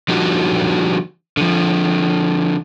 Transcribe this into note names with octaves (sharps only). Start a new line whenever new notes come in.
D3 F3 G3 D#4 F#4
D3 F3